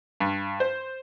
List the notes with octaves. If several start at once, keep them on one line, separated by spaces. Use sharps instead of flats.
G2
C5